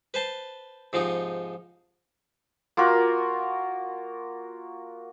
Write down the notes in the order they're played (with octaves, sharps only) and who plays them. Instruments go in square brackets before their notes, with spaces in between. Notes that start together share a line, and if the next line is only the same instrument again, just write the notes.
[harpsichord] B4 C5 A5 C6
G#2 C3 F3 D#4
[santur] A#3 F4 F#4 A#4